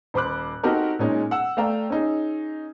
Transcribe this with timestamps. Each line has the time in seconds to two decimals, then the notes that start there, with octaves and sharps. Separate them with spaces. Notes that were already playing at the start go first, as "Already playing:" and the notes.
0.14 D#1 C5 B5 D6 F#6
0.63 C4 D#4 F#4 G4 A4 A#4
0.99 A#2 G#3 C#4 D#4
1.31 F#5 E6
1.57 A3 D5 F5 G5 A#5
1.90 C#4 D#4 G#4